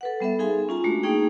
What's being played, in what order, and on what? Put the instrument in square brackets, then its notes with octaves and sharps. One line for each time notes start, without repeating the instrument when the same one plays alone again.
[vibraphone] A4 B4 F#5
G3 B3 A4 E5
D#4 G#4 F5 G#5 C6
C#4 F4 A#5
G#3 A3 D4 F#4
A#3 C#4 D#4 G#4 G5